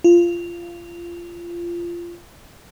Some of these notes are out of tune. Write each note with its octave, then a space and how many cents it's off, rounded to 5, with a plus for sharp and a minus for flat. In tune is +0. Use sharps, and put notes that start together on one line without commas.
F4 -20